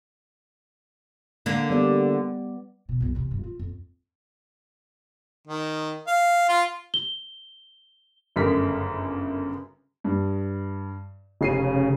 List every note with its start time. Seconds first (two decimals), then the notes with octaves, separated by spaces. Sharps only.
1.46 D3 A#3
1.70 G3 B3 D5
2.89 B2
3.00 B1 F2
3.15 E2 C3
3.31 G2
3.43 F4
3.59 F2
5.47 D#3
6.07 F5
6.49 F4
6.94 G7
8.36 G1 F#2 C#3 A3 A#4 B6
10.04 G2
11.41 F1 C#3 C7 D#7